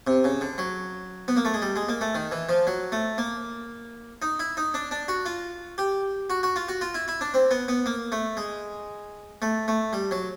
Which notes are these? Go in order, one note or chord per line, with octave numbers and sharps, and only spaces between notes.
C3
C#3
D3
F#3
B3
A#3
A3
G#3
G3
G#3
A#3
A3
D#3
E3
F3
F#3
A3
A#3
D#4
E4
D#4
D4
D4
F#4
F4
G4
F#4
F#4
F4
F#4
F4
E4
E4
D4
C4
B3
B3
A#3
A3
G#3
A3
A3
G3
F#3